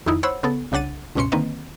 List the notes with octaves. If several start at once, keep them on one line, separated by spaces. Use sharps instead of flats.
F2 D#3 D#4 E4
C5 C#5 F#5 B5 E6
C#3 B3 A4
C2 C#3 D4 F#5 A6 D#7
C#2 G2 B2 C#4 C6 C#7
D3 D#3 A#3 C4 B4 D#5